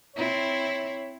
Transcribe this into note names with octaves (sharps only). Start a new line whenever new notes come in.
C4 E4 C#5